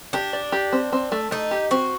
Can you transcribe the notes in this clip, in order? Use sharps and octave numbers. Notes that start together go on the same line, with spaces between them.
D4 G4
D5
G4
C4
C4
A3
A3 D#4
G4
C4 F#4